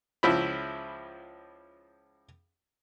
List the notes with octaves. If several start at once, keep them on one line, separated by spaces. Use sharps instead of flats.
C#2 F3 E4 B5